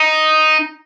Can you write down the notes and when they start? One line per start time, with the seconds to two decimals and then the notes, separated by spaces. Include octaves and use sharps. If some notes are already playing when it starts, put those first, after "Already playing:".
Already playing: D#4